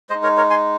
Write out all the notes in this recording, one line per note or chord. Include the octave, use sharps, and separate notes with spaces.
G#3 D#4 C5 D#5
A#4 C#5
A#4 C#5
G#5 C6